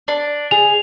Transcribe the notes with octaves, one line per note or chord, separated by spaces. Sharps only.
D4
G#4 F7